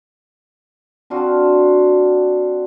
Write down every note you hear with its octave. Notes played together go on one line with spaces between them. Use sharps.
C4 D4 F4 F#4